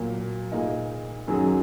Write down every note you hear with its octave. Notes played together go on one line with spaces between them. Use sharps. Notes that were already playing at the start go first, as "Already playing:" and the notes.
Already playing: A#2 F#3 A#3
A#2 A#3 D#4 G#4
F#2 D#3 F#3 C#4 G#4